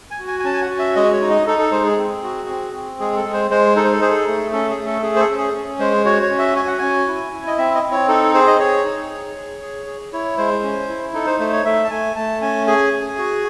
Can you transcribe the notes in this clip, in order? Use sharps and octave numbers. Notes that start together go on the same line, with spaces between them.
G#5
F#4
G#5
G#5
C#4 A5
G#5
F#5
F#4
E5
G#3 D#5
C#5
D#4
D#5
D#4 A4
A4
G#3 C5
G#4
C4
F#4
C4
C4
G#3 G#4
A4
G#3
C5
G#3 C5
D#4 A4
C5
A4
G#4 C5
A4
A3
C#4 A4
G#4
A3
A4
G#4
C5
A4
C#4
G#4
C#4
G#3 C5
F#4 C#5
C#5
C#4
E5
F#4 G#5
F#5
C#4 G#5
E4
E4
D#5
C4 E5
D#5
C4
C#5
D#4 A4
G#4 C5
D#5
G#4 C#5
D#4
G#4
G#4
G#4
G#4
E4 C#5
G#3 C5
C#4
E4
D#4 A4
C5
A3 C5
C#5
A3 E5
A5
A3 G#5
A3 A5
C#4 G#5
G#4 G#5
G#4
F#4